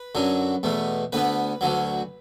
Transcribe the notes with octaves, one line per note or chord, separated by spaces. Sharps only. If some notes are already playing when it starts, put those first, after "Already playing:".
Already playing: B4
F#2 D3 F#3
E2 B2 A3
D2 D3 B3 B4
D2 D3 F#3